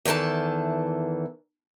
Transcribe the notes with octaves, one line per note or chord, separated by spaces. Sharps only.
E2 D#3 E3 A4 A5